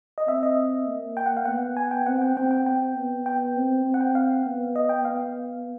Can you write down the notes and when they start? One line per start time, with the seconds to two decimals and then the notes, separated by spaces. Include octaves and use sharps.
0.18 D#5
0.27 C4 E5
0.43 D#5
0.87 A#3
1.17 G5
1.26 F#5
1.37 F5
1.45 B3 F#5
1.77 G#5
1.91 G5
2.07 C4 F#5
2.21 G5
2.37 C4 G5
2.51 G5
2.66 C4 G5
2.96 B3
3.26 G5
3.56 C4
3.85 C4
3.94 F#5
4.01 G5
4.15 F5
4.46 B3
4.76 D#5
4.89 G5
5.05 B3 F5